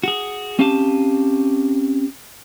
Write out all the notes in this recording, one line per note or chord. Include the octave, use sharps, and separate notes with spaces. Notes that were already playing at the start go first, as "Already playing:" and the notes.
F#4 G#4
C4 C#4 G4 F5 G#5 A5